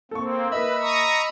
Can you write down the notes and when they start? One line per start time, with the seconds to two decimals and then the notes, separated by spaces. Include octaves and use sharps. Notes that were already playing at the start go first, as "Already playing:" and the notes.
0.11 A#3 C4 A4 C#6
0.52 A#3 A#4 B4 D#5 E5 B5 E6
0.80 A#5 C#6 D#6